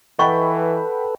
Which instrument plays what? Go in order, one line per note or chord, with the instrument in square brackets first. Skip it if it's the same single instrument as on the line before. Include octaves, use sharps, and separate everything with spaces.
[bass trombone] E3 [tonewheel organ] A4 B4 [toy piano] D#5 C#6 [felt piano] F#5 G5 B5